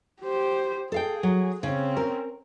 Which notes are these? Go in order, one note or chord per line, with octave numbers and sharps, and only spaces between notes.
G4 C5
G#4 A4 F5 G5
F#3
C#3 C4 C#4
A#4